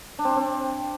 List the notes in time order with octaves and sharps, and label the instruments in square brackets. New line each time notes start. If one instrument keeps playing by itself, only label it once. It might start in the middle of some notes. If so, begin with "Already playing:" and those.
[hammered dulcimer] D4
C4
D4
C4